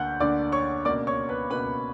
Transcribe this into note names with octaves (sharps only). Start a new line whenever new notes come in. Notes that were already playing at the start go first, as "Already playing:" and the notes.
Already playing: D2 D3 A#3 F#5 F#6 G6
D2 D3 A#3 D5 D6
C#5 C#6
C#2 B2 A#3 D5 D6
C#5 C#6
B4 B5
C#2 B2 A#3 B4 B5